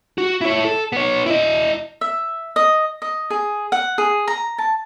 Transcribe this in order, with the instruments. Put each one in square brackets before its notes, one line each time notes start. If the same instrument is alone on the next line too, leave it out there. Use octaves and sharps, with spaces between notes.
[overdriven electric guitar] F#4
E4 C#5
A4
B3 C#5
E4 D#5
[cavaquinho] E5
D#5
D#5
G#4
F#5
G#4
A#5
A5